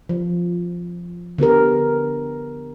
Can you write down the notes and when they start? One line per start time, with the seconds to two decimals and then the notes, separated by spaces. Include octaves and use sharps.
0.09 F3
1.38 D3 B3 G4 A#4